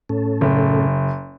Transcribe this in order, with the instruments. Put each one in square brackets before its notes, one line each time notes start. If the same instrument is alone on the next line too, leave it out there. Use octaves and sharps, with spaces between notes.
[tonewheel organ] A2 C#4 A4
[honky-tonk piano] F#1